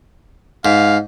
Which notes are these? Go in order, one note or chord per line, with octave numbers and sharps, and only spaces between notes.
G#2 F5